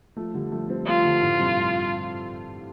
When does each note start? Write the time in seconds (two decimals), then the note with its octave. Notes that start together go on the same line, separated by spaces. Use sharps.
0.16 F3 A3
0.34 D3 G3
0.52 F3 A3
0.69 G3 C4
0.87 F3 A3 F4
1.05 D3 G3
1.22 A2 D3
1.39 G2 C3